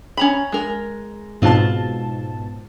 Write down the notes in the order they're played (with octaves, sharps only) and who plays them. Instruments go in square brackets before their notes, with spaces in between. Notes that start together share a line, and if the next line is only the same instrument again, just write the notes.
[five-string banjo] C#4 A#5 B5
G#3 A#4
[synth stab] G#2 B2 A5 [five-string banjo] C4 F4